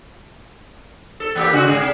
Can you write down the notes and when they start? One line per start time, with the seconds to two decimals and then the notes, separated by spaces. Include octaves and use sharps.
1.20 A4
1.35 E3 A#3 G4
1.53 C#3 F#4
1.67 G#2 G#4
1.79 C3